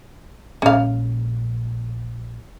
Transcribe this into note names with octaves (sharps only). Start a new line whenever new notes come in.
A#1 A#2 G#3 C#4 F5